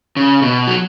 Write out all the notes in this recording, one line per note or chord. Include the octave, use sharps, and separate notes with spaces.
C#3
B2
F#3